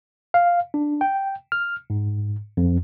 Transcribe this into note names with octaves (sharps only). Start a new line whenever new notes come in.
F5
D4
G5
F6
G#2
F2